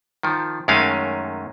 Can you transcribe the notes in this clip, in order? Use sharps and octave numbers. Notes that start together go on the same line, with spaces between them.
D#3 F3
F#2 D#3 G#3 A3 C#4 F5